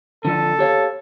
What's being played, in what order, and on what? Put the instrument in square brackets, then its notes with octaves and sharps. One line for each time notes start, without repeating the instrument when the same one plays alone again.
[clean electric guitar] D3 F3 D4 [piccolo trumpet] A4
[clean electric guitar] G4 C#5 F5